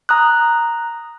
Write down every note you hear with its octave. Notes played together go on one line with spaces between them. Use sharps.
A#5 D#6 F#6